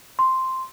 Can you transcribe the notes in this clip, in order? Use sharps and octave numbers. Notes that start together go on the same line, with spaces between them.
C6